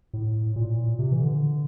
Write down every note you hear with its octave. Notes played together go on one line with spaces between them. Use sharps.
A2
A#2
C3
E3
D3